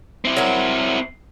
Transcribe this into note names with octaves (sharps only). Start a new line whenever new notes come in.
C4 E4
F#3 A#4